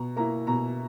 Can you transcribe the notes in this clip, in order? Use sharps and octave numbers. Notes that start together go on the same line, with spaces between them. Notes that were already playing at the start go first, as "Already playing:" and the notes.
Already playing: B2 A#5
A#3 E4 A#5
B2 A#5